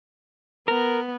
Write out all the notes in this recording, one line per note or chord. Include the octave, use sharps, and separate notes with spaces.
B3 A#4